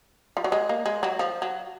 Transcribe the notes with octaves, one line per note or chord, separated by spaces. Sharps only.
F3
F#3
G#3
A#3
G#3
F#3
F3
F#3